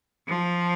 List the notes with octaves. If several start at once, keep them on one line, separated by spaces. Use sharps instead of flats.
F3